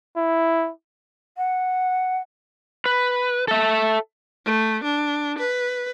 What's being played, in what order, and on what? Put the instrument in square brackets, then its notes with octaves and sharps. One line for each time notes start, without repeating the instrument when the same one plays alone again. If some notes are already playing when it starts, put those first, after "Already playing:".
[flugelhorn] E4
[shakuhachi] F#5
[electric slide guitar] B4
A4 E5
[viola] A3
D4
B4